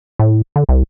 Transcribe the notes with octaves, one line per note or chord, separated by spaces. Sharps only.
A2
D3
C2